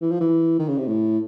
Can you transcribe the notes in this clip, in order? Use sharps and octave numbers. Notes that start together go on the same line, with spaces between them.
E3
F3
E3
D#3
C#3
C3
A2